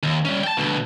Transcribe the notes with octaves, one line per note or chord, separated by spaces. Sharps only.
D#2
G3 C#4
G5 A5
D2 B2